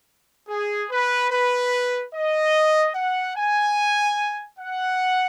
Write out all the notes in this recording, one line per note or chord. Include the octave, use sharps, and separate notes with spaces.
G#4
B4
B4
D#5
F#5
G#5
F#5